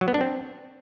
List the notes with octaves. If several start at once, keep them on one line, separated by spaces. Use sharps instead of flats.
F#3
B3
D4
C4